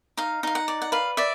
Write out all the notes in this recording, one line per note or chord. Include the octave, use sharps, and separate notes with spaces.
D#4 F5
D#4 F5
F#5
D5
F#5
B4 F5
D5 E5